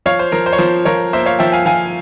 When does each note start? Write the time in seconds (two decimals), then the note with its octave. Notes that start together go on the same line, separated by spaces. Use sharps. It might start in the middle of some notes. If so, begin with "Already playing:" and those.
0.06 F3 C#5 F5
0.19 C5
0.32 F3 A#4
0.46 C5
0.53 C#5
0.58 F3 C5
0.85 F3 A#4 C#5
1.13 A#3 C5 E5
1.26 C#5 F5
1.39 F3 E5 G5
1.52 F5 G#5
1.66 F3 F5 G#5